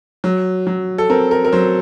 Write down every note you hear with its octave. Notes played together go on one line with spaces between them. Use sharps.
F#3
F#3
A4
C4 A#4
A#4
A#4
F#3 C5